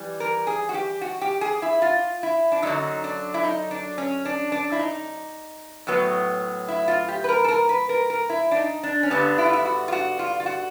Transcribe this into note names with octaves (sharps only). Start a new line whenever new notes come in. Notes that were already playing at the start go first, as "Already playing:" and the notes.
Already playing: E3 G3
A#4
G#4
F#4
G4
F#4
G4
G#4
E4
F4
E4
D4
F#2 D3 F#3 D#4
D4
E4
D#4
D4
C#4
D4
D4
E4
D#4
A2 F#3 B3
E4
F4
G4
B4
A#4
A4
A#4
B4
A#4
A#4
E4
D4
D#4
D4
C#4
G2 D3 G3 B3 D4
E4
F4
E4
F#4
F4
F#4
F4
F4
F#4